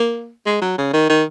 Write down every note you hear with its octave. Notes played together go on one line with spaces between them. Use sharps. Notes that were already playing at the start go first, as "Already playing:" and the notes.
Already playing: A#3
G#3
F#3
C#3
D#3
D#3